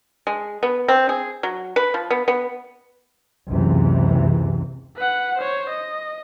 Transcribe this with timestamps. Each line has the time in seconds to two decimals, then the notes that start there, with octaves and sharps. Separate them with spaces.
0.27 G#3
0.63 B3
0.88 C4
1.09 G#4
1.43 F#3
1.76 B4
1.94 F3
2.10 B3
2.28 B3
3.50 F#1 C#2 C3 E3
4.96 B4 F#5
5.37 C5 C#5
5.69 D#5